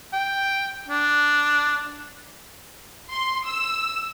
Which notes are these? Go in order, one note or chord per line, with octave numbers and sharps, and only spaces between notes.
G5
D4
C6
E6